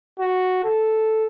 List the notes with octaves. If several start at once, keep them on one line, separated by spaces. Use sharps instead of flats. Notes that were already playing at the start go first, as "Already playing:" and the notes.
F#4
A4